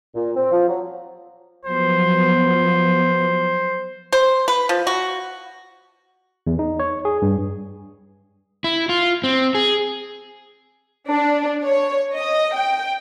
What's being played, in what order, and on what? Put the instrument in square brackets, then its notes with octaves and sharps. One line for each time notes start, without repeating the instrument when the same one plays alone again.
[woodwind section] A#2
C4
F3
F#3
[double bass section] F3 F#3 B3 [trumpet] C5
[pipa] C5
B4
F3
F#4
[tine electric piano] E2
D#4
C#5
G#4
G2
[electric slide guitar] E4
F4
C4
G#4
[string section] D4
C#5
D#5
G5